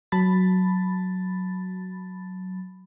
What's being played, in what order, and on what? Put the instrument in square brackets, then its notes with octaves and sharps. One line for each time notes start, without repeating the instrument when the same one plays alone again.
[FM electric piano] F#3 A5 B5 A6